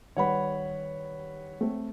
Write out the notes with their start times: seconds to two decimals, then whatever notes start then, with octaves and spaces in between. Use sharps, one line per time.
0.17 D#3 G3 B4 C#5 F#5 B5
1.61 A3 C4